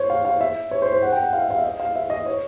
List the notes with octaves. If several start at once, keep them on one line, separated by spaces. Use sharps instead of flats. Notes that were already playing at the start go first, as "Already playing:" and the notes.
Already playing: C5 C#5
F5
F5
E5
C#5
C5
C5
F#5
G5
F#5
F5
E5
F5
E5
D#5
F5
E5
D#5
C#5